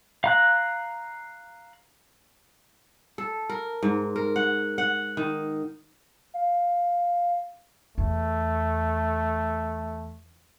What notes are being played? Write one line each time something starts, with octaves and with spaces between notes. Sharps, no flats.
F5 A#5 F#6
A4
A#4
G#2
A#4
F#5
F#5
D#3
F5
E2 A3